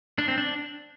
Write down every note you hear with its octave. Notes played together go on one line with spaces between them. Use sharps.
D4
C4
D4